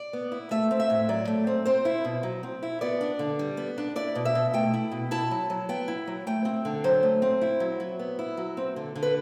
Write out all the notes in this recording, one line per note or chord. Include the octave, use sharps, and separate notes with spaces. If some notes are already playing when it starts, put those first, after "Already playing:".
Already playing: D5
B3
E4
A3 E5
C4
E5
A2
F#3 D5
A3
C4
C4 C5
E4
B2
F#3
C4
E4
B3 D5
D4
D3
G3
B3
D4
E4 D5
B2
E5
B2
A3 G5
E4
B2
E4 A5
F#3
F#3
B3 G5
E4
F#3
A3 G5
C4
D3
F#3 C5
A3
C4
E4
F#3
F#3
B3
E4
F#3
C4
D3
D3
B4